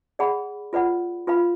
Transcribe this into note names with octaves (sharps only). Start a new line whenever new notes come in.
G#4 D5 F#5 B5
F4 B4 D5 F#5 B5
F4 B4 F5 B5